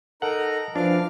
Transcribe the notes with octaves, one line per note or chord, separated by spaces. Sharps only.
D#4 A4 A#4 F#5 A#5
E3 F3 D4 F5 D6 F6